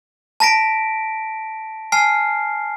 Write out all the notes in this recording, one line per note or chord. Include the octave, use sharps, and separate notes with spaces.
A5 A#5 A#6 B6 D7
G#5 A5 F6 C7